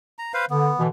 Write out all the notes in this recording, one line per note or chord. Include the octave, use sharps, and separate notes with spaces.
A#5
B4 C5 F5
D3 B3
B2 D3 E3